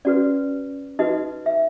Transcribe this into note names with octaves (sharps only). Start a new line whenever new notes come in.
C#4 F#4 B4 D5
D#4 F#4 B4 D#5
E5